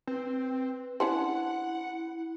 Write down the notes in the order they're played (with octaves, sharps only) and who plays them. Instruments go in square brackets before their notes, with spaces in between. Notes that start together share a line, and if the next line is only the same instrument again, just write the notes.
[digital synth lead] C4 [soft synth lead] B4
[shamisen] C#4 D4 C5 [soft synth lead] E4 [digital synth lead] F#5